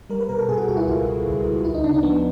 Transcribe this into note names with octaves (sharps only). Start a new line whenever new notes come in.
G3 A#4
B4
B2 A#4
A4
B2 G#4
F#4
C#2 F#4
E4
C#2 F4
C#2
C#2
C#2
D2 E4
D#4
C#3 D4
D4
F3 B3